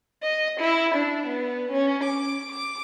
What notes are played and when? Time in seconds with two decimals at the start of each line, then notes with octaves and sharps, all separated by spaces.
0.23 D#5
0.60 E4
0.94 D4
1.26 B3
1.71 C#4
2.03 D6
2.51 D6